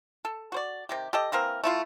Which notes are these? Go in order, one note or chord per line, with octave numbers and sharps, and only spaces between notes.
A4
F#4 C5 D5
C3 D#3 G4
G4 A4 D#5
E3 A#3 C4 A#4
A3 E4 F4